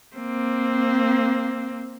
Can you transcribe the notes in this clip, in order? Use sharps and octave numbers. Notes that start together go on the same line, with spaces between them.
A#3 C4